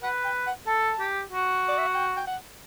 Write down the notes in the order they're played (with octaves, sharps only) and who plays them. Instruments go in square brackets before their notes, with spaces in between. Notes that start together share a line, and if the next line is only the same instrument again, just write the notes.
[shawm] B4 [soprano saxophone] F#5
[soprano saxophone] G5
F#5
[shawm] A4 [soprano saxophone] A5
[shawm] G4
F#4
[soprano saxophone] D5
E5
F#5
G5
G5
F#5